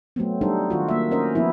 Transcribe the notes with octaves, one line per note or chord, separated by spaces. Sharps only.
F#3 A3 B3 C4
G3 D4 D#4 A4 C5
D#3 F4 F#4
A#3 E5
C#4 A#4 C5 D#5
F3 B3 E4